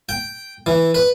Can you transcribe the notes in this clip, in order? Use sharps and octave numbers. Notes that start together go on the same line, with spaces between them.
G5
E3
B4